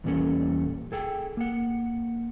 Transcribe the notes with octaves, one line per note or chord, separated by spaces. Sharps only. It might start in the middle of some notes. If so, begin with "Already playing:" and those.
E2 A#2 G3 C#4 A4
G#4 A4 G5
A#3 F#5